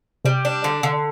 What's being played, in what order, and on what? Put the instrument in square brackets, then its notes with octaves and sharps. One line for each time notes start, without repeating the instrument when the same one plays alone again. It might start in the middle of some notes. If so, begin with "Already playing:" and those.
[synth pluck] C3 [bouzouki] G3
[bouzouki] D4
D3
D3